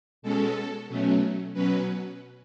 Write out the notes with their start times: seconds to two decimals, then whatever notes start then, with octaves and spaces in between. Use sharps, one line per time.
0.22 B2 G#3 C#4 A4
0.88 B2 F#3 A3 C#4
1.54 B2 F#3 C#4 B4